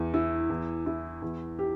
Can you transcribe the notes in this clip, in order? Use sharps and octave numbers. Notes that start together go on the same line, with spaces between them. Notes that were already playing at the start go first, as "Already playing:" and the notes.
Already playing: E2
E4
E2
E4
E2
G4